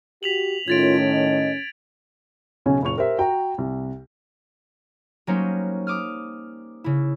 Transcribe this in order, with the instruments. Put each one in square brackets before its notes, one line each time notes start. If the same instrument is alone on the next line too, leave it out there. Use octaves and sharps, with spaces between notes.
[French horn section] F#4 G4 [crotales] B6 F7 F#7
[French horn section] A2 D#3 [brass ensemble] C#4 [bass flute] F4 [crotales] G#6 A6 D7
[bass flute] D#5
[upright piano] B1 C#3 C#4 G#5
F#1 A#2 C#6 F7
G4 A#4 C5 E5
F#4 G5 A#5
C2
[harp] F#3 G3 A#3 C#4 D#4 C5
D6 D#6 F6
C#3 E4